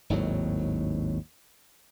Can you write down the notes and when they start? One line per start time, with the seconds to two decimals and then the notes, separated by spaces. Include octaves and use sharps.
0.10 G#1 D#2 A2 F#3